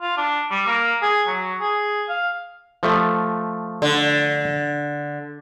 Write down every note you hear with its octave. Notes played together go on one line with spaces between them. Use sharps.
F4
D4
G3
A#3
G#4
F#3
G#4
F5
F3 A3
D3